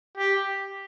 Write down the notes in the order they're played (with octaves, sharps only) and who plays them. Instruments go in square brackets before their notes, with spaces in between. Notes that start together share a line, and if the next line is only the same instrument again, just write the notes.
[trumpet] G4